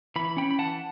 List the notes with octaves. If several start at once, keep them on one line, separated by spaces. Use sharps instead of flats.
E3 B5
C#4 G5 B5
B5
E3 F#5 A5